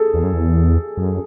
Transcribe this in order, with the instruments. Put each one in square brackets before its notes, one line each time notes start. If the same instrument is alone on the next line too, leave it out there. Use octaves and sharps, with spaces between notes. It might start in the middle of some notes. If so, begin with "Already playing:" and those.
Already playing: [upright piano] G#4 A4
[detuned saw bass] E2
F#2
E2
F#2